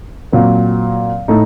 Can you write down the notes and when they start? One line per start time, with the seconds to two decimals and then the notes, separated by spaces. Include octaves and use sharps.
0.32 A#2 F#3 C4
1.28 A2 A3 D#4